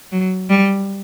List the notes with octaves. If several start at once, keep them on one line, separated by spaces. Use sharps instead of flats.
F#3
G3